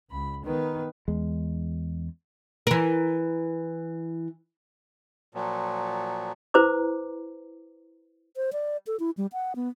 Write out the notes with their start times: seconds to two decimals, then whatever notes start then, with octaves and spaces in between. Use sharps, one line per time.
0.11 C#2 B5
0.44 D#3 B3 B4
1.08 E2 G#3
2.67 E3 A#4
5.35 A#2 F3 F#3
6.54 E4 B4 C5 A#5 D6
8.36 C5
8.53 D5
8.87 A4
9.00 E4
9.17 G3
9.33 F#5
9.56 B3